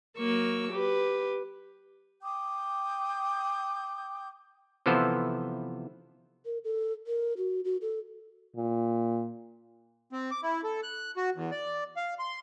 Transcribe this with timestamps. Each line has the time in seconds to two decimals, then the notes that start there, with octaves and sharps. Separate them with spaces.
0.18 F#3 A#3 C#6 E6
0.72 G4 B4
2.21 G5 D6 D#6 G6
4.86 C3 E3 F3 B3 A4 C5
6.45 A#4
6.64 A4
7.07 A#4
7.37 F#4
7.65 F#4
7.82 A4
8.57 A#2
10.13 C4
10.31 D6
10.43 E4
10.64 A4
10.83 F#6
11.17 F#4
11.35 E2
11.51 D5
11.97 F5
12.19 C6